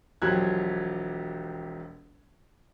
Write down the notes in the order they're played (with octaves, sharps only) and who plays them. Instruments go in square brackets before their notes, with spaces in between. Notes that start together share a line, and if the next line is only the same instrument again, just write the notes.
[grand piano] E1 F3 F#3 G4 F#6 G#6